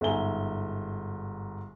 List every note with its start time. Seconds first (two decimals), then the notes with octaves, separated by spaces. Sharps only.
0.01 G1 G#2 E5 G#5 G7